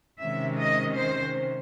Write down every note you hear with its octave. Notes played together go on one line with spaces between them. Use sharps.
C3 D#3 G#3 C#4 E5
D#5
C5